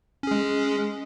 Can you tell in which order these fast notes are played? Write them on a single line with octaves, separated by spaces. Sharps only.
C#4 G#4 G#3